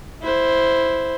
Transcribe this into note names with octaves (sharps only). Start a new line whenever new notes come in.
E4 C5